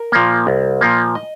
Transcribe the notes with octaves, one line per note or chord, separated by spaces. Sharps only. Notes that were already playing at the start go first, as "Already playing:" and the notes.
Already playing: A#4
A#2 F3 A#3
C2
A#2 F3 A#3
D#5